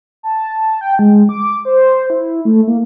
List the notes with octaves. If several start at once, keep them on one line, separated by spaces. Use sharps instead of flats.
A5
G5
G#3
D6
C5
E4
A3
A#3